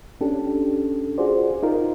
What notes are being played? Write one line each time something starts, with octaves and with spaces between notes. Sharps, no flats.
C#4 D4 G4 A4
F4 F#4 G#4 C5 D5
D#4 F4 A#4